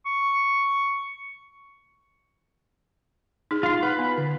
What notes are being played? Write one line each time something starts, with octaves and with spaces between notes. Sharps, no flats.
C#6
D#4 G#4
F4 C6
B4 F#5
B3
D3